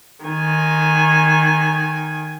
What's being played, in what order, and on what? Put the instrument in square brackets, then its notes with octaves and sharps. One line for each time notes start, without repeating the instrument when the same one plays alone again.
[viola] D#3 G#5